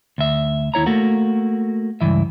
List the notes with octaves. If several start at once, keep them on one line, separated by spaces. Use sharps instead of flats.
D2 E5
D#2 E4 C#5 A#5
A3 A#3 F#4
C#2 G2 E3 E5